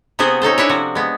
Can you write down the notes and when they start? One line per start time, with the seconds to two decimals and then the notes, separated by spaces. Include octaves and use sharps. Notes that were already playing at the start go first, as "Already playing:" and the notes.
0.19 C3 B3 F#4 G#4 C5
0.42 C#4 D#4 A4 C5
0.58 C#4 D4 E4 B4 C#5
0.69 C3 F3 F#4
0.95 G#3 B3